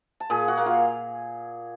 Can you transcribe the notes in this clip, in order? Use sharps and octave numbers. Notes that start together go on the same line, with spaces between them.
A5
A#2 G#4 G#5
F#4 F#5
A#3
F4 F5